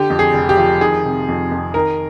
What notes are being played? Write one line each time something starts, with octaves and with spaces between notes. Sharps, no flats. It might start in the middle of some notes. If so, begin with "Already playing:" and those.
Already playing: D3 G4
F2
G#4
F1
G4
F3
D#3 G#4
C3
F2
F2
D#3 A#4